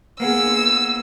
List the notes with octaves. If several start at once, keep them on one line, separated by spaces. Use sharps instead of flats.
A#3 B3 G#4 E6